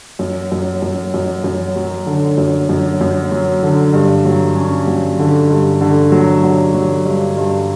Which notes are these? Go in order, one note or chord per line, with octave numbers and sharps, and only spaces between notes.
F#2
F#2
F#2
F#2
F#2
F#3
D3
F#2
F#2
F#2
F#3
D3
G2
F#3
C#4
F#3
D3
G2
D3
F#3
F#3
F#3
G2
G2